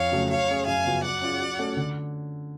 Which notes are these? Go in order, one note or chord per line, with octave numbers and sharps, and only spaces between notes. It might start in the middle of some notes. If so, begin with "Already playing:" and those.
Already playing: F2 C#5 F5
C#3 F#3 A3 C#4
F#3 C#5 F5
A3 C#4 G#4
F#2 F5 G#5
C#3 F3 B3 F#4
F#3 D5 F#5
C#4 F4 G#4
F#3
A3 C#4 F#4 A4
D3